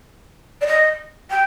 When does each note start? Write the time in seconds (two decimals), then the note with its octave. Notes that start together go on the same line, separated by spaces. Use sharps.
0.61 D5
0.66 D#5
1.30 G5